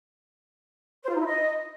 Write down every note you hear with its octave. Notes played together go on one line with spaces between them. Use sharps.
C5
F4
D#4
E4
D#5